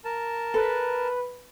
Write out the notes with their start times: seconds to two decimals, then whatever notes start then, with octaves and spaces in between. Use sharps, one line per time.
0.05 A#4 A5
0.54 A4 B4